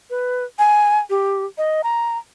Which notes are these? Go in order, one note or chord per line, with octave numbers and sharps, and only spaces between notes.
B4
G#5
G4
D#5
A#5